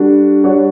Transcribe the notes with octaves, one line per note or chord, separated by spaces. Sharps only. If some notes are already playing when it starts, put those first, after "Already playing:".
Already playing: G3 D4 F#4 A4
G3 D4 F#4 C#5